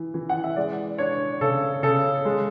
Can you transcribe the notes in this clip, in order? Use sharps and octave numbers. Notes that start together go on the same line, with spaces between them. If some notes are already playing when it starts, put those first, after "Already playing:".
Already playing: E3
E3
F#5
E5
G#3 D5
D4 C#5
C#3 A4
C#3 A4
G#3